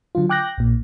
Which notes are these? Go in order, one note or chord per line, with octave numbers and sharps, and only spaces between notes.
D3 F#3 F4
G5 D6 F#6 G6 A#6
A#1 A#2